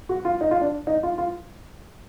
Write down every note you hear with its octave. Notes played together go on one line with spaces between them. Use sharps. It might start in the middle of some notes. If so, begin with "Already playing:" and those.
F#4
F4
D#4
F4
D4
D#4
F4
F4